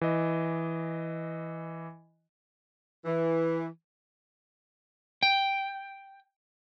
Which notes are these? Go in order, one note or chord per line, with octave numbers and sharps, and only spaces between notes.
E3 D#5
E3
G5